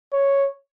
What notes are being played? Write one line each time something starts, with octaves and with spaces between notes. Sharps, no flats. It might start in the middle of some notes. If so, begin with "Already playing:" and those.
C#5